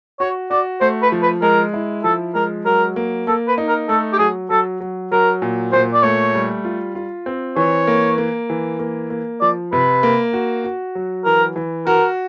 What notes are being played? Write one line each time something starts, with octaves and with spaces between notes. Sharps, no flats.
F#4 C#5
F#4 D5
A3 C5
B4
F3
B4
G#3 A#4
E4
F3 A4
G#3 A#4
F#3 A#4
A#3
A#3 A4
B4
D#4
A#4
A3 A4
G4
F#3 G#4
F#3 A4
F#3
F#3 A#4
A#2
A#2 C5
D5
A3 C#5
G3
F4
F4
C4
E3 C#5
A#3
A#3
E3
A#3
A#3
F3 D5
C3 B4
A#3
F#4
F#4
F#3
E3 A#4
E3
F#4 A#4